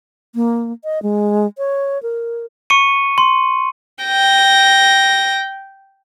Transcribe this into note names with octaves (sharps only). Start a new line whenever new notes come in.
A#3
D#5
G#3
C#5
A#4
C#6 C#7 D#7
C6
G5 A#6